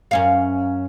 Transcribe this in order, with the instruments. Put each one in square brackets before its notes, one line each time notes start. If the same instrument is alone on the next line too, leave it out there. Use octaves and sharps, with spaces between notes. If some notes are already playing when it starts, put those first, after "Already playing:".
[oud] F#2 C#4 F5